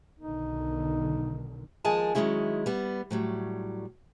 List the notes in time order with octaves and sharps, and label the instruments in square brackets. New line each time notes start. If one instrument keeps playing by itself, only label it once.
[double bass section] B1 D3 D#3 [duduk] D#4
[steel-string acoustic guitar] D#2 F3 G#3 G#4 A#4 A5
D#3 E3 F#3 G#3 C#4 E4
G3 B3
A2 F#3 G3